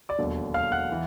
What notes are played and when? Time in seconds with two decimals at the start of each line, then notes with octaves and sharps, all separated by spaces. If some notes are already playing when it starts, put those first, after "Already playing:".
0.09 D5 D6
0.19 E1 D#2 D3 F#3
0.54 F5 F6
0.72 F#5 F#6
0.92 E3